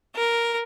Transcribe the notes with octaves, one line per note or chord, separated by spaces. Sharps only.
A#4